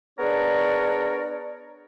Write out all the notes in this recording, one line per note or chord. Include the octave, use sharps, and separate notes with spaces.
B3 D4 G#4 A#4 C#5 D5